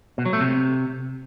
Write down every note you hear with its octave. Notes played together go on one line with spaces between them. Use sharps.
B2
F#3
A3
C3